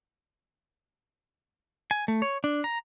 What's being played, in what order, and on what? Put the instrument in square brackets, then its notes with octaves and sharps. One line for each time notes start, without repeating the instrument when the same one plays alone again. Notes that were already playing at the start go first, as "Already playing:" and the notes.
[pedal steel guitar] G#5
A3
C#5
D4
A#5